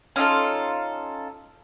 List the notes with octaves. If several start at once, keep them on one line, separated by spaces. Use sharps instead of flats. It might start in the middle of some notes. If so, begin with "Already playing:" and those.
C#4 D#4 F4 A4